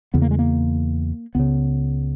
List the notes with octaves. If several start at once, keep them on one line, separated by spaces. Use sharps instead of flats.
E2 C#3 B3
A#3
G#3
A#3
C#2 C#3 B3